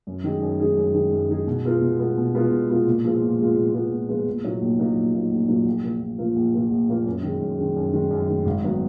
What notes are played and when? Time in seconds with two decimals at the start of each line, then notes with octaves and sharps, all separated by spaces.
0.07 F#2
0.24 D#3 G#3 D#4 G#4
0.42 F#2
0.59 D#3 G#3 D#4 G#4
0.77 F#2
0.94 D#3 G#3 D#4 G#4
1.12 F#2
1.29 D#3 G#3 D#4 G#4
1.47 B2
1.65 G#3 B3 F4 A#4
1.82 B2
1.99 G#3 B3 F4 A#4
2.17 B2
2.34 G#3 B3 F4 A#4
2.52 B2
2.69 G#3 B3 F4 A#4
2.86 A#2
3.04 F3 G#3 B3 F4
3.22 A#2
3.39 F3 G#3 B3 F4
3.57 A#2
3.74 F3 G#3 B3 F4
3.91 A#2
4.09 F3 G#3 B3 F4
4.27 A#1
4.44 A#2 F#3 A#3 D#4
4.61 A#1
4.79 A#2 F#3 A#3 D#4
4.96 A#1
5.14 A#2 F#3 A#3 D#4
5.31 A#1
5.49 A#2 F#3 A#3 D#4
5.66 A#1
5.84 A#2 F3 A#3
6.01 A#1
6.18 A#2 F3 A#3
6.36 A#1
6.54 A#2 F3 A#3
6.71 A#1
6.88 A#2 F3 A#3
7.06 F#2
7.23 D#3 G#3
7.41 F#2
7.58 D#3 G#3
7.76 F#2
7.93 D#3 G#3
8.11 F#2
8.28 D#3 G#3
8.45 G#1
8.64 D#3 F#3 B3